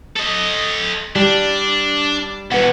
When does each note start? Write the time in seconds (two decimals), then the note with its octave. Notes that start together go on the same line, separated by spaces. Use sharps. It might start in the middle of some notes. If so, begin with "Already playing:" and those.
0.16 A4 D#5
1.16 G3 D4
2.52 E2 B2 B4 F#5